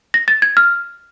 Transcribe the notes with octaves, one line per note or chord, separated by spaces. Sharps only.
A#6
A6
G#6
F6